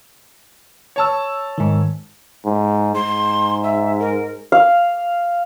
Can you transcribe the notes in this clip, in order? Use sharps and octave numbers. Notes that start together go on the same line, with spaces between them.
C#5 A5 E6
G#2 D#3
G#2
G#2 C6
E5
A#4
F5